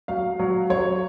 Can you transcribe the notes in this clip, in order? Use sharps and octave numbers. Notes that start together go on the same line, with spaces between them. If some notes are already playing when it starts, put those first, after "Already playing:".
F#3 F5
F#3
F#3 C#5